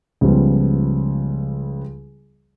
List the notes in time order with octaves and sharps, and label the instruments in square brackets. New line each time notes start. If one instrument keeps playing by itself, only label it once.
[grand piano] C#2 F3 G3 B3